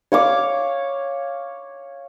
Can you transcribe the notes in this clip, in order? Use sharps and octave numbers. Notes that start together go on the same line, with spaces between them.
C#5 F5 D6